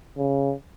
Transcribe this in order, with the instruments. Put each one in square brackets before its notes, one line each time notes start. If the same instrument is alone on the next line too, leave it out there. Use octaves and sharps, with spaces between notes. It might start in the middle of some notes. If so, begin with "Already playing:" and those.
[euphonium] C#3